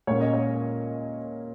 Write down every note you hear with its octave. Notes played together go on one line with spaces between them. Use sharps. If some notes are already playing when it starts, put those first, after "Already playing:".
A#2 G#3 C#4 C#5
D#5
C#5